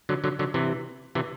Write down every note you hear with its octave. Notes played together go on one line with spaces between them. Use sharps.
D3 F#3
D3 F#3
D3 F#3
C3 E3
C3 E3